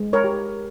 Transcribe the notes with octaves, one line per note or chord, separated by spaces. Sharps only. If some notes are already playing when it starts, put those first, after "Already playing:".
Already playing: G#3
A#4 C#5
G4